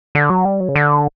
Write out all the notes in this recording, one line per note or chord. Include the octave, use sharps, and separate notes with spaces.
D3
F#3
G3
F#3
C#3
D3